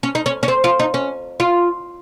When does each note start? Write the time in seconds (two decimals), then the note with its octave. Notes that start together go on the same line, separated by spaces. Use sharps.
0.03 C#4
0.15 D#4
0.26 C#4
0.43 C#4
0.48 C4
0.64 F4
0.79 D#4
0.94 C#4
1.40 F4